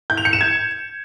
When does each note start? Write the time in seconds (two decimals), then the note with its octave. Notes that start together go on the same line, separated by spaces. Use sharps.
0.10 G6
0.17 F7
0.25 C#7
0.33 E7
0.41 G#6